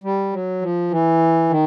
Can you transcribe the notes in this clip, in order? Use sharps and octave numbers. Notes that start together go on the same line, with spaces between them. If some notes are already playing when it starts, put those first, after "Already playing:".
G3
F#3
F3
E3
D#3